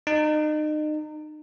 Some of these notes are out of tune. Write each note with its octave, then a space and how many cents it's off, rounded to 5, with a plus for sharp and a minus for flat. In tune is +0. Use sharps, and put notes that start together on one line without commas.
D#4 -35